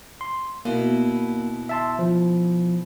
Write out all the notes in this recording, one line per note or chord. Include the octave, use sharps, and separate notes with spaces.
C6
B2 A#3 E4
E5 A5 C6
F3